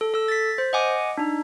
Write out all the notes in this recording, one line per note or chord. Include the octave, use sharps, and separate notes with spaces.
A4
A4 E6
A6 B6
C5
D#5 F#5 G#5 D6
D4 D#4